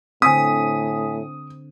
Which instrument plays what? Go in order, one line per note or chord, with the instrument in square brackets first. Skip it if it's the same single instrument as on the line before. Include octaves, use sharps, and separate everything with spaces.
[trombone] A2 [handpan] D3 C4 [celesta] G#5 B6 [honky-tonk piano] D#6